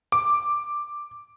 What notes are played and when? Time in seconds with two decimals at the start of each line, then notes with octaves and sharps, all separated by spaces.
0.12 D6